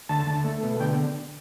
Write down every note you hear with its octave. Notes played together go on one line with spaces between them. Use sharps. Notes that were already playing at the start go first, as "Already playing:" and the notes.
D2 A5
D2
A3
B2
D3 G5